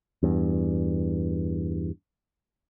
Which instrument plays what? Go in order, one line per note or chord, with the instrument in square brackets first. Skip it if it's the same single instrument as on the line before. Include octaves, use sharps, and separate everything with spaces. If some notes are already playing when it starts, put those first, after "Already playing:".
[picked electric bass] E2 G2